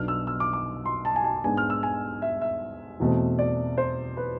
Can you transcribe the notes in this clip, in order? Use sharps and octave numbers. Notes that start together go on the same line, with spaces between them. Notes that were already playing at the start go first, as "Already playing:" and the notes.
Already playing: B1 B2 B3 D4 F6
E6
E6
D6
D6
C6
A5
G#5
A5
G#2 G#3 B3 D4 G#5
F6
E6
G#5
E5
E5
E2 B2 A3 C4
D5
C5
B4